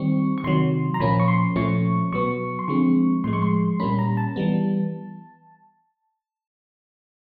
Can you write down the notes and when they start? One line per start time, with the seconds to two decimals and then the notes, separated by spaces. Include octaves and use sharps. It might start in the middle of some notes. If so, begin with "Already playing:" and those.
Already playing: D#3 G3 C4 C#6
0.38 C#6
0.44 C3 D#3 F#3 C6
0.94 A#5
1.00 A#2 F3 A#3 C#4 B5
1.20 C#6
1.28 C6
1.56 A#2 F3 A3 C#4 C#6
2.12 B2 F#3 B3 C#6
2.59 C6
2.68 D3 F3 G#3 C4 C#6
3.24 A2 F3 G#3 C6
3.33 C#6
3.42 C6
3.80 A#2 G3 A#3 C#4 B5
3.99 A#5
4.17 A5
4.36 E3 G3 B3